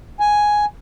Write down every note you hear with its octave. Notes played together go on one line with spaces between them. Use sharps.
G#5